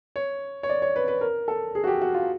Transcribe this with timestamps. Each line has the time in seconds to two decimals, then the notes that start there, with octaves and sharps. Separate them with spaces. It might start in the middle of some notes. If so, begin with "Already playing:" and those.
0.16 C#5
0.63 C#5
0.69 D5
0.82 C#5
0.96 B4
1.08 B4
1.21 A#4
1.48 A4
1.75 G#4
1.84 F#4
1.87 G4
2.01 F#4
2.14 F4